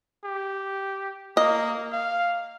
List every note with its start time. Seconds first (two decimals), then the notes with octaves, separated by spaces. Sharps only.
0.25 G4
1.37 A#3 D#5
1.92 F5